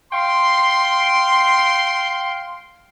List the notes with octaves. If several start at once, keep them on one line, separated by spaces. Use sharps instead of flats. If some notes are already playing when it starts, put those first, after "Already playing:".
F5 G5 C6